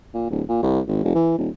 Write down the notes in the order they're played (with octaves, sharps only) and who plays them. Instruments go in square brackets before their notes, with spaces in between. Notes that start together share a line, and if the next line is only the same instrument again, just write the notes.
[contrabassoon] A#2
D1
A#2
C2
G#1
F1
E3
D#1